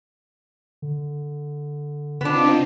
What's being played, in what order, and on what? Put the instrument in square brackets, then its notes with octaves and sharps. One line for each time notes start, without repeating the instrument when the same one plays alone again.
[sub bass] D3
[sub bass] C#3 [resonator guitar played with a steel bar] B3 D4 [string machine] C4 D#4 F4